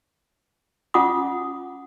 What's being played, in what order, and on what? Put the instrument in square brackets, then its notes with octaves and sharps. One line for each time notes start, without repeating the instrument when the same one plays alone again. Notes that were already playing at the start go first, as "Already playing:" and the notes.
[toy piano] C#4 F4 F#5 G#5 D6 D#6